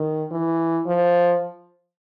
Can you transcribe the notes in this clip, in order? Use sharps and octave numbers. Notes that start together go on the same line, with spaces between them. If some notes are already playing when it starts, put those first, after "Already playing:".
Already playing: D#3
E3
F3